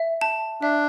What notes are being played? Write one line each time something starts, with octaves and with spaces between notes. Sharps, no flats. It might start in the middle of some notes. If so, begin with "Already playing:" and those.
Already playing: E5
A5
D4 E5